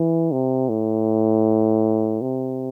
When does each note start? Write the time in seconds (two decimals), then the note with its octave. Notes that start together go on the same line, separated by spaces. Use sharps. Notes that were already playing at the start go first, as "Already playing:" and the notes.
Already playing: E3
0.32 C3
0.69 A2
2.22 C3